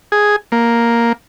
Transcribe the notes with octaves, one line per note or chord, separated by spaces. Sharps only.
G#4
A#3